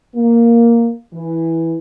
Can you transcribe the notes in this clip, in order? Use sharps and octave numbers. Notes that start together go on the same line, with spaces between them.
A#3
E3